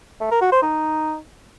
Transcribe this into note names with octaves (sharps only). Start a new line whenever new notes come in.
A3
A#4
F#4
C5
D#4